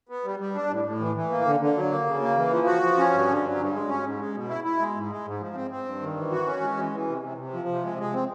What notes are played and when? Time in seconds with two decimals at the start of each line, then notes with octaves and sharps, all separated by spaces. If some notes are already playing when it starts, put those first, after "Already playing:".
0.09 B3
0.24 G3
0.39 G3
0.55 D4
0.70 A2
0.85 A2
1.00 E3
1.15 E3
1.31 A#3
1.45 D3
1.60 D3
1.76 F#3
1.91 A#3
2.06 C#3
2.22 A#3
2.37 E3
2.51 F3
2.67 F#4
2.82 F3
2.98 C#4
3.12 G2
3.27 D3
3.43 F#3
3.58 G2
3.73 G#3
3.88 C#4
4.03 G#2
4.19 G#3
4.34 B2
4.49 E4
4.64 E4
4.79 G#3
4.95 G#2
5.10 G#3
5.26 G#2
5.40 F3
5.55 C4
5.71 C4
5.85 G2
6.01 D#3
6.16 E3
6.31 F#4
6.46 C#4
6.61 G#3
6.77 E3
6.92 E3
7.07 C3
7.22 C3
7.38 C3
7.53 F3
7.68 C3
7.83 G#3
7.98 G#3
8.14 C4